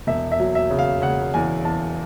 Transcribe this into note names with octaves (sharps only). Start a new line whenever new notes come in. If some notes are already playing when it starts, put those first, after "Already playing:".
E1 E5
E5
F#3
E5
C#3
F5
C#3 F#5
E2 G#5
E2 A5